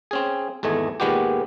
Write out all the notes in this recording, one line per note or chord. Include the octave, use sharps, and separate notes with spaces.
C4 C#4 G#4
G#1 E2 A3 D#5 G#5
A#2 D#3 G#3 B3 F#4 G4